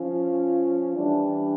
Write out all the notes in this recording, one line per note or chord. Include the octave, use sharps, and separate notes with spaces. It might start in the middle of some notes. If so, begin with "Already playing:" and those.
Already playing: F3 C#4 F4
E3 G3 D4